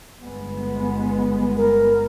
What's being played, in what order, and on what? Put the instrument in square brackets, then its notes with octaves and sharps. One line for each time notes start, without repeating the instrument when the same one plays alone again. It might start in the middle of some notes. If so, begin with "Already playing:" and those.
[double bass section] G1 G#3 B3
[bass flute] A#4